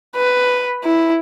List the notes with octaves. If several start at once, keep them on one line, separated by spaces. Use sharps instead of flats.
B4
E4